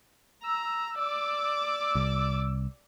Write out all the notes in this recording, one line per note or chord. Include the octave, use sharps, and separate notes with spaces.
A#5 E6
D5 D6
C2